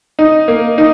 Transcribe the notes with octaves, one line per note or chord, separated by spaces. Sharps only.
D#4
A#3
D#4